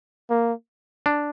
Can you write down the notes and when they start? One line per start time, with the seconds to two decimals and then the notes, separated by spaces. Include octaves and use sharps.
0.30 A#3
1.06 D4